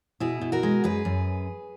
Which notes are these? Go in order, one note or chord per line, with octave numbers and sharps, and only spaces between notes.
B2 E4 G#4
B2
F#4 A#4
G#3
F#2 G#4 B4
F#2